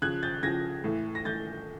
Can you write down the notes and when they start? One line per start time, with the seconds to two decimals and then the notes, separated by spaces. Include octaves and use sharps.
0.02 C#3 F3 F#6 G#6
0.23 G6 A6
0.43 C#3 F3 G#6 A#6
0.84 A2 E3
1.15 A#6
1.25 A2 E3 G6 A6